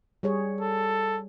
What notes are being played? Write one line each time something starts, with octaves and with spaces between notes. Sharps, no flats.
G3 G#4 C#5
A4